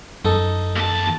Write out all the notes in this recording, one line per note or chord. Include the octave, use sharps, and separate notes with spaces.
F#2 D#4 A4
D#2 A5